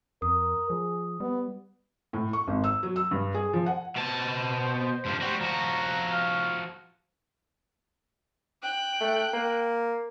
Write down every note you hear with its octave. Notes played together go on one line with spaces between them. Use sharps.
F2 A#4 D#6
F3 G#4
G3 B3
A2
C#6
G#1
E6
F#3
E6
G2
G#4
F3
F#5
B2 C5 A5
G2 F3
G3 F#4
F3 F#4 A#5
F5
G5 F#6
A3
A#3